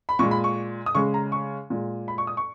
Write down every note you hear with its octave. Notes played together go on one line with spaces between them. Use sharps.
B5
A#2 G#3 C#6
B5
C#6
D#6
C#3 G#3 C#6
A#5
C#6
A#2 G#3
B5
C#6
D#6
C#6